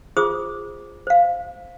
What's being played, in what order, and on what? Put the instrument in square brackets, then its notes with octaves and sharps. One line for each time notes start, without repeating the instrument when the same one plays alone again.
[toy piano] F4 G#4 C5 D6 D#6
C5 F5